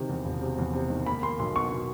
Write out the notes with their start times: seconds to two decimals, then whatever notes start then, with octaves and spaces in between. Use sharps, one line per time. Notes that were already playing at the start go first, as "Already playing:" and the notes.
Already playing: C3 D#3
0.09 E2
0.25 E1
0.41 C3
0.58 E2
0.74 C3
0.90 D#3
1.06 A#3 B5
1.23 A#3 C6
1.39 B1 C6
1.56 B2 C#6
1.71 B2